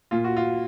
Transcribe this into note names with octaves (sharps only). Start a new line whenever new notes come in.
A#2 F4
F#4
F4